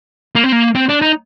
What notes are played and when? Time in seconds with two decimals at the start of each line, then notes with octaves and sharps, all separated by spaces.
0.35 A#3
0.44 C4
0.52 A#3
0.75 C4
0.89 D4
1.02 D#4